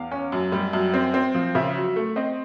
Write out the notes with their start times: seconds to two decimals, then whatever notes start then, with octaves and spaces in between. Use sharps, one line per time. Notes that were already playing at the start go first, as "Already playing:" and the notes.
Already playing: E2 F5
0.11 C#4
0.32 F#2
0.52 G3
0.73 F#2
0.94 C4
1.14 C4
1.35 F3
1.55 C#3 E5
1.75 F#3
1.96 A3
2.16 C4 D#5